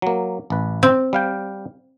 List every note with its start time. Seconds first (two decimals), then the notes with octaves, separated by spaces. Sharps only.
0.02 F#3 A#3
0.50 A1 B4
0.83 C4
1.13 G3 F5 G5